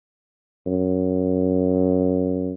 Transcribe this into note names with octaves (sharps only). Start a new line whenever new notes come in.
F#2